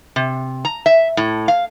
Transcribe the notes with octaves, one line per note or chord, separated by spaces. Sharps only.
C3
A#5
E5
A2
F5